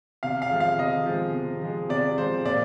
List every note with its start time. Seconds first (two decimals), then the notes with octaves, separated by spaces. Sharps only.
0.23 C3 F5
0.42 F5
0.51 F3 G#3
0.60 F5
0.79 C3 D#5
1.06 F3 G#3
1.35 C3
1.62 F3 G#3
1.89 C3 D5
2.18 F3 G#3 C5
2.45 A#2 D5